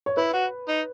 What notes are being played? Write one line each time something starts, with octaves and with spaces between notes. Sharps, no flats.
C#5
E4 B4
F#4
D#4